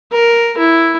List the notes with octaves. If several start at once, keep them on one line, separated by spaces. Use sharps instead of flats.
A#4
E4